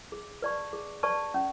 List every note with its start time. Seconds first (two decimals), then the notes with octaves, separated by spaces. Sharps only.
0.12 G#4
0.42 B4 D5 A5 C#6
0.73 G#4
1.03 B4 D5 A5 C#6
1.34 C#4